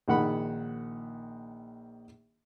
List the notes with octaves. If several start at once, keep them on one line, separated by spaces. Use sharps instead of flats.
A#1 D#3 F#5 B5